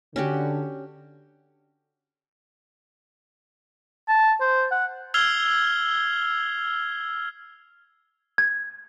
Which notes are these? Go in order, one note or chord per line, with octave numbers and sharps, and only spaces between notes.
D3 C#4 F#4 G4
A5
C5
F#5
E6 F6 G#6 C7 F7 G7
G#6